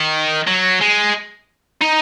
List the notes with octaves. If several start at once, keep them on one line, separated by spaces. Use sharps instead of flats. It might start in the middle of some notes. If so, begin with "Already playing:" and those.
Already playing: D#3
F#3
G#3
D#4